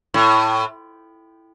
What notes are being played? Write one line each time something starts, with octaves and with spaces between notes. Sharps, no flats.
A2